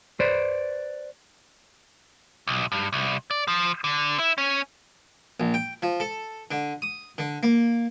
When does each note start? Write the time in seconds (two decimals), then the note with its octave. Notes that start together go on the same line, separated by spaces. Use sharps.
0.20 B4 C5 D5
2.47 B1
2.72 G2
2.93 C2
3.31 D5
3.48 F3
3.84 D3
4.19 E4
4.38 C#4
5.40 A#1
5.54 G5
5.82 F3
6.00 A4
6.51 D3
6.82 D#6
7.18 D3
7.43 A#3